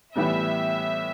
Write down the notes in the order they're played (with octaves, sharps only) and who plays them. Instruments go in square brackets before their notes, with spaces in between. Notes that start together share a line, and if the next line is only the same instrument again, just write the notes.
[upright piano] A2 E3 G3 B3 [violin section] E5